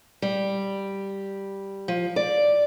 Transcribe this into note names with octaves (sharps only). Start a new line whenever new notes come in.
G3
F3
D5